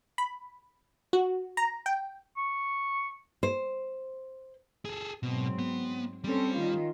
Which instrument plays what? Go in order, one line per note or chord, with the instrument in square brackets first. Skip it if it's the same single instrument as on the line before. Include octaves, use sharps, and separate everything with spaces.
[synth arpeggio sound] B5
F#4
A#5
G5
[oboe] C#6
[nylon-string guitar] C5
[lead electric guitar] G#4 A4
[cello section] G#2 F#3 C4 [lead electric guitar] B2
[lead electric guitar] B3
[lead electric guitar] G3 [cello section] C4 C#4 A4
[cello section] D#3 F4